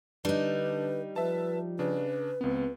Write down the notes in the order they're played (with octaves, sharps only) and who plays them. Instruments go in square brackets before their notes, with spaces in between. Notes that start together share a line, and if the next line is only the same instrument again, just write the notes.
[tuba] D3 [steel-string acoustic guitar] G3 D#4 [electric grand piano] D4 [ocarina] B4
[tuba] F3 [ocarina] B4 [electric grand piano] E5 A5
[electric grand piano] C#3 D4 [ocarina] B4
[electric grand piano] C#2 B3 [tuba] C4